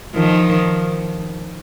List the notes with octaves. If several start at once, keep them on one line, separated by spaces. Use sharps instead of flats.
D#3 F3